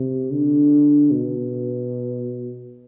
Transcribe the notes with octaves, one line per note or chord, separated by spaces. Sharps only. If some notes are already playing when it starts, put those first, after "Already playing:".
Already playing: C3
D3
B2